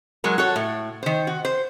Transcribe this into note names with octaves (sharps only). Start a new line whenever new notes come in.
F#3 G#3 F#4 A#4
F#4 A4 C#5
A2
D#3 C5
F#4
C5